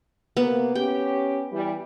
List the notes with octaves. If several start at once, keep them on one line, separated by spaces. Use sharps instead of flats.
C3 A#3 B3
C#4 G4 G5
E3 G3